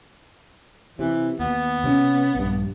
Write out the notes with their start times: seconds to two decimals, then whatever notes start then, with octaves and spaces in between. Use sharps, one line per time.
0.99 C3 E3
1.39 D#2 B3
1.84 C3 C4 C#4
2.35 A#1 G2